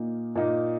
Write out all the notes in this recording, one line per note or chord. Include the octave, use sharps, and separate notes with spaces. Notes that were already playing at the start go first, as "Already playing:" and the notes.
Already playing: A#2 A#3 D#4
A#2 A#3 D#4